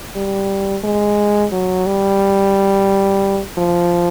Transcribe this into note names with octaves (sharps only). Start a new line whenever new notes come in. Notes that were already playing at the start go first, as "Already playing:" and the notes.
G3
G#3
F#3
G3
F3